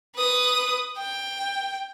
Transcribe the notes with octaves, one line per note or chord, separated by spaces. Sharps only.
B4 D#6
G5